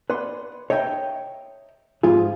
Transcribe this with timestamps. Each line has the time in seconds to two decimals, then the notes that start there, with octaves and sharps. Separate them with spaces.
0.10 B4 D5 F#5 C6
0.70 C#5 D#5 E5 G5 A5 A#5
2.03 G#2 C3 F3 F4 G#4